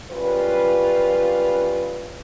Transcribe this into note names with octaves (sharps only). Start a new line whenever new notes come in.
F#2 G3 F4 B4